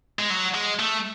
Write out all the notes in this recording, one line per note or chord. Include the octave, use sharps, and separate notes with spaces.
G#3
F#3
G#3
A3